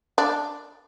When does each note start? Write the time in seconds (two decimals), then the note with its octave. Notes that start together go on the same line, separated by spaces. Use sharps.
0.18 D4